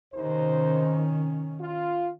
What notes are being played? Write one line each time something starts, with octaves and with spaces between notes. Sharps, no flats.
D#2 C3 D#3 C#4 D#4 C5
F4